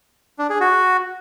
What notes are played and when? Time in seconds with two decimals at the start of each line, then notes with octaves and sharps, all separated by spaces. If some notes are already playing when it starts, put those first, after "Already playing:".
0.39 D4
0.50 G#4
0.61 F#4